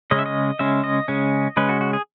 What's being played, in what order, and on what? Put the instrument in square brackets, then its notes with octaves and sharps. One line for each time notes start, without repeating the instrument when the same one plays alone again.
[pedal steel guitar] C#3 G#3 C#4 D#5
E5
D#5
C#3 G#3 C#4 E5
D#5
C#3 G#3 C#4
C#3 G#3 C#4 B4
F#4
F#4
G#4